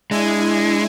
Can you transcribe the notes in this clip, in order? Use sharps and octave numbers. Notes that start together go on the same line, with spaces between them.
G#3 D4 E4 G#5